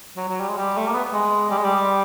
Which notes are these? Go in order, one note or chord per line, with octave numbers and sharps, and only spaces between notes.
F#3
F#3
G3
G#3
G3
A3
A#3
B3
G#3
G3
G#3
G3